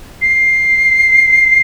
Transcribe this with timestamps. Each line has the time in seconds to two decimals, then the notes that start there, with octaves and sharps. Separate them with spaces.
0.22 C7